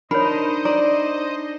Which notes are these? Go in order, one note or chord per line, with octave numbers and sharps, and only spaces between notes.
D4 D#4 A#4 C5 C#5 D#5 B5
D5 A#5